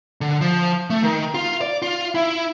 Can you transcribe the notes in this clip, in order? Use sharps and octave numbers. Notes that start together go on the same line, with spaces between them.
D3
F3
A3
D#3
F4
D5
F4
E4